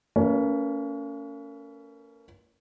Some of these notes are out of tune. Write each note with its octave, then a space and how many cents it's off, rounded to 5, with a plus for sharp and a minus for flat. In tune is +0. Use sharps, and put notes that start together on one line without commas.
A#3 -35 C#4 +25 B4 -45